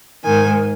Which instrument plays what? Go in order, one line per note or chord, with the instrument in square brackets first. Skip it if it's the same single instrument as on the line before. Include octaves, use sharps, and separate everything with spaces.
[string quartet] G#2 D#3 G#5